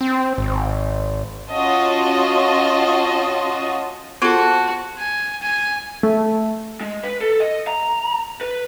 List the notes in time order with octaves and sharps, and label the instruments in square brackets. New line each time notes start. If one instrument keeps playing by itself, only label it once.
[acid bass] C4
G#1
[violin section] C#4 F4 F#4 D#5 A5
[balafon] B3 F4 [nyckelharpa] F#4 [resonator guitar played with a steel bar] A4 C5
[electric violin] G#5
G#5
[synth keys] A3
[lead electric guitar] G#3
B4
A4
D#5
A#5
B4